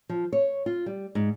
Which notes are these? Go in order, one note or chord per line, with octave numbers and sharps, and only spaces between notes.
F3
C#5
F4
G3
G#2